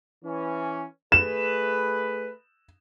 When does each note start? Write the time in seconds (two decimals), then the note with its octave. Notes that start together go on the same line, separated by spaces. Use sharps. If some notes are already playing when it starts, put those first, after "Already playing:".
0.24 E3 C#4
1.12 A3 G#4 B4 E7